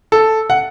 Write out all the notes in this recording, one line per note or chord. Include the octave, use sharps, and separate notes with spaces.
A4
F#5